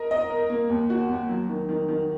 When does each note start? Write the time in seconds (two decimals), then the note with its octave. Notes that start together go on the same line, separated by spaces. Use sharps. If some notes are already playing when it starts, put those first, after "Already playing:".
Already playing: A#4 D#5
0.11 D#5
0.30 A#4
0.49 A#3
0.69 D#2
0.90 F#4
1.09 D#2
1.29 F#3
1.49 D#3
1.69 D#3
1.88 D#3